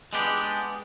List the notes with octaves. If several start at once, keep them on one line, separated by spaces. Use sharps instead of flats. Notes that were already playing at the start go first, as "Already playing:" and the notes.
G#3 B3 D4 G4